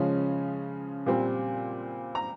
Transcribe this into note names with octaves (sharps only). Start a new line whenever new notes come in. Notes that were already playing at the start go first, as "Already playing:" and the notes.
Already playing: C#3 F3 G#3 C#4
A#2 G3 C4
A#5